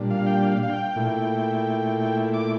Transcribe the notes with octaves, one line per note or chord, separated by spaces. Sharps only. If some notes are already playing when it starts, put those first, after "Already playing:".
Already playing: A#2 G3 D4
F5
G5
F5
F5
G5
A#2 A3 E4
G5
D6